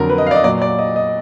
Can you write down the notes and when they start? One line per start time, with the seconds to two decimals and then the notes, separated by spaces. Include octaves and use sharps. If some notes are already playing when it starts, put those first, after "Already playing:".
Already playing: F2 D3 F#3 A#4
0.09 B4
0.18 D#5
0.27 F5
0.31 D5
0.36 D#5
0.44 A#2 F#3 D5
0.62 D5
0.79 D#5
0.96 D#5